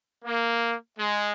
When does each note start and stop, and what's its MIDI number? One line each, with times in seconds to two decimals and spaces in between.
0.24 0.74 58
0.97 1.32 56